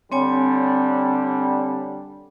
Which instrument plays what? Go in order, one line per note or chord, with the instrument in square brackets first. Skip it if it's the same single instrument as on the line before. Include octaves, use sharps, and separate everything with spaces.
[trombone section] D3 G3 [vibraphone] C4 C#5 G#5